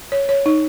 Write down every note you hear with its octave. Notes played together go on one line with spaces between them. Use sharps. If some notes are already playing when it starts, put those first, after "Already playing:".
C#5
C#5
D#4